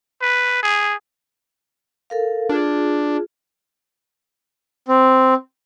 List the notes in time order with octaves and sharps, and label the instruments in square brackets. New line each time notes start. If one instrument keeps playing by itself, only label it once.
[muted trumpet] B4
G#4
[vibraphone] A4 A#4 F5
[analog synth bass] D4 [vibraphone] F4 G#4
[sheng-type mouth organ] C4